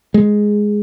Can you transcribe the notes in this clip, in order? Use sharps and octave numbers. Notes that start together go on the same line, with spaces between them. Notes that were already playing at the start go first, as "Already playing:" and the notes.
G#3